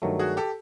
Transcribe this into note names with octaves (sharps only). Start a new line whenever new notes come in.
G2 D#3 F#3 A3
F#4 G#4
G4 A4